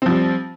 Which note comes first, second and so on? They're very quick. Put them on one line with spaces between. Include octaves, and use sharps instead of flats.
C4 F3 G3